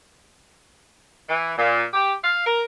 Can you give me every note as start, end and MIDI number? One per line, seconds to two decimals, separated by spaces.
1.28 1.52 52
1.58 1.83 46
1.93 2.13 67
2.23 2.45 77
2.45 2.62 70